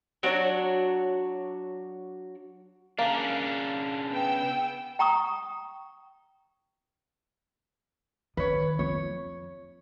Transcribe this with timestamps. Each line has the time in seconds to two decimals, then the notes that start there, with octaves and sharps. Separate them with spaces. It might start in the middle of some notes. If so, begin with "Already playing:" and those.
0.23 F#3 D4 F#4 C#5
2.98 C#3 A#3 D4
4.09 B3 G5 E6
4.99 G5 A#5 C#6 D#6
8.37 D#3 B4 C#5
8.79 F2 C#5